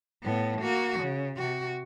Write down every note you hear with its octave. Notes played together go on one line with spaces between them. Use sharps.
A2 B3
A#3 F#4
C#3
C3 F#4